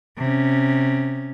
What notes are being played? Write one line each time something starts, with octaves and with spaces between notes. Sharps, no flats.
C3 C#4